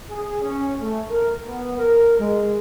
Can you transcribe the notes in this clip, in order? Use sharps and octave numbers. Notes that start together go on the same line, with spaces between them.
G#4
C#4
A3
A#4
B3
A#4
G#3